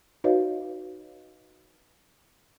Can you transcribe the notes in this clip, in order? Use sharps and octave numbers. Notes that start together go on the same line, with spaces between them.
D#4 F#4 B4 C#5 D#5 F5